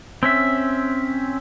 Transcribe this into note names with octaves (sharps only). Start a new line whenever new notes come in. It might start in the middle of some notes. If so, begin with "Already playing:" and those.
C4 C#4 E5